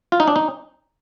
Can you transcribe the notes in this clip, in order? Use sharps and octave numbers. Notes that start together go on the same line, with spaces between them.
F4
D#4
D4
D#4